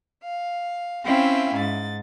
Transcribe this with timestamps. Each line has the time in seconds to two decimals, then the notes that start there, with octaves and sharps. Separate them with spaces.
0.24 F5
1.05 C4 C#4 E4 E5 F5 G5
1.56 G#2 A6